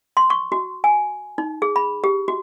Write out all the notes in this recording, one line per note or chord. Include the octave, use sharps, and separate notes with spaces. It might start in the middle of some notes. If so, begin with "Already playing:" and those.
C6
C#6
F#4
G#5
D#4
G#4
B5
G4
F#4